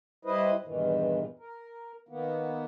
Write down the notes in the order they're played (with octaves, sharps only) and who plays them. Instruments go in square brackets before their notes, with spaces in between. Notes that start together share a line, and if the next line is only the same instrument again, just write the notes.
[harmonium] G3 E4 B4 C5 D#5
E2 G2 A#2 D#3 E3
A#4
D#3 A#3 B3